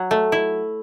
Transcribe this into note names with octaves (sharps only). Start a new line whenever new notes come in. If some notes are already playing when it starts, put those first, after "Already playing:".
Already playing: F#3
A3
E4